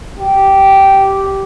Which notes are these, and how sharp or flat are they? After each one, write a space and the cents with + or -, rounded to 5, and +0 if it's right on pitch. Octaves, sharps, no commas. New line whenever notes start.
G4 -10